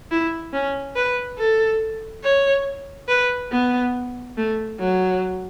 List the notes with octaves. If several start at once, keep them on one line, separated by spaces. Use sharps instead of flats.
E4
C#4
B4
A4
C#5
B4
B3
A3
F#3